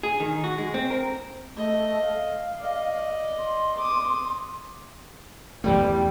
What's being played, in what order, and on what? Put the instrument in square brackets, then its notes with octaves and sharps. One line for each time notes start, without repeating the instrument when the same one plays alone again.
[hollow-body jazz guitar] G#4
D#3
F#4
G#3
C4
A#4
[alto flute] A3 [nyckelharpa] D#5
[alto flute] F5
[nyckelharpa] D5 D#5
[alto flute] C6
[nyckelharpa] D6 D#6
[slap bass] E2 E3 A3 [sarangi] G3